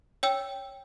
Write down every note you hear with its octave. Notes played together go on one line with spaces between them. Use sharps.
C#5 G5 E6